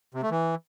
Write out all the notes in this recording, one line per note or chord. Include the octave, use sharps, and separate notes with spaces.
C3
A3
E3